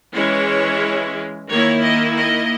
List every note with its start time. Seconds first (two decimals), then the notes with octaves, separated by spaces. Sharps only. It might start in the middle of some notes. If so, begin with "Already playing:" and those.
0.15 E3 G#3 C#4 E4 C#5
1.49 D#3 A#3 E4 C#5
1.82 D#5
2.16 D#5